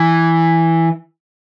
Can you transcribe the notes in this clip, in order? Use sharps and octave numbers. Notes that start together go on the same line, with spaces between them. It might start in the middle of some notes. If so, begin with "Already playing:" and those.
Already playing: E3